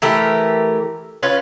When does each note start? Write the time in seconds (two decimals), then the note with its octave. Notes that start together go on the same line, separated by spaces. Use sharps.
0.02 E3 A3 G4 A#4
1.23 C#4 F4 B4